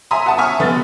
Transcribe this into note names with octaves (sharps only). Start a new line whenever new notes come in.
E5 G#5 A#5 C6 D#6
F#5 A5 D#6
E5 G#5 C#6 D#6 F6
F1 B3 A6